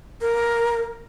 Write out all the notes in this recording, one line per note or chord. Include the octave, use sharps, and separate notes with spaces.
A#4